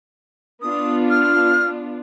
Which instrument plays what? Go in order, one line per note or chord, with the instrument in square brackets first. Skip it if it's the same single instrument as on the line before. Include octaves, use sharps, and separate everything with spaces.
[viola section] B3 D4 F4 [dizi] D#6
[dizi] F6